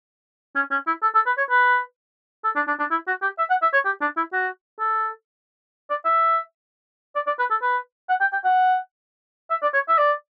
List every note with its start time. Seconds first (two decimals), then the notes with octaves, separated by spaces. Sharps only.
0.56 C#4
0.71 C#4
0.87 E4
1.02 A4
1.15 A4
1.26 B4
1.38 C#5
1.50 B4
2.44 A4
2.56 D4
2.68 D4
2.79 D4
2.91 E4
3.07 F#4
3.22 G4
3.38 E5
3.50 F#5
3.62 E5
3.73 C#5
3.85 G4
4.01 D4
4.17 E4
4.33 F#4
4.80 A4
5.90 D5
6.05 E5
7.15 D5
7.27 D5
7.39 B4
7.51 A4
7.62 B4
8.09 F#5
8.21 G5
8.33 G5
8.44 F#5
9.50 E5
9.62 D5
9.74 C#5
9.89 E5
9.98 D5